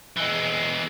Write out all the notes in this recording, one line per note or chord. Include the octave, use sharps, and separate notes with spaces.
E3 G#3